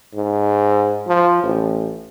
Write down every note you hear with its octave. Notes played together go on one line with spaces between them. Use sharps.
G#2
F3
A1